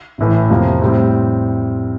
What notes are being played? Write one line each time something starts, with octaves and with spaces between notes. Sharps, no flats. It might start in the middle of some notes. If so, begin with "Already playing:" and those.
A1 A2 E3 A3
F2 C3 F3 A#3
A2 G3 C4